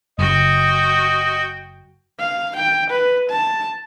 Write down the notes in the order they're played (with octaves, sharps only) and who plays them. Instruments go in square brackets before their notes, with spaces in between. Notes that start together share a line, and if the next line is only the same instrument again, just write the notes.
[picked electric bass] F#1 [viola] F#4 G5 [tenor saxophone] D#5
[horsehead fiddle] F5
G5
B4
A5